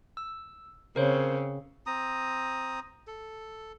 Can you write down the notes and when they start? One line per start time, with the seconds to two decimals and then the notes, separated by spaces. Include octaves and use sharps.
0.17 E6
0.96 C#3 C4 A#4 C5 C#5
1.86 C4 A#5 D#6
3.07 A4